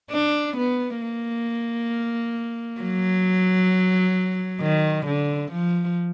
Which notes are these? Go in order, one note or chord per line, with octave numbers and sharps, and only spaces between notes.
D4
B3
A#3
F#3
D#3
D3
F3